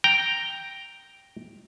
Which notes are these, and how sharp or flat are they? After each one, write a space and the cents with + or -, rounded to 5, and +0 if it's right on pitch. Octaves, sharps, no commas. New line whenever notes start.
G5 +0 A#5 +0